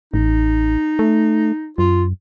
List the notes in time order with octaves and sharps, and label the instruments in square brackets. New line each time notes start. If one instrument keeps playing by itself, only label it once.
[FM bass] A1 [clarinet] D#4
[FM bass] A3
[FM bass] F#2 [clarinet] F4